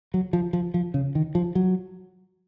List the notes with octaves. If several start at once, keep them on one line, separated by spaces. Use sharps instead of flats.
F#3
F3
F3
F3
C#3
D#3
F3
F#3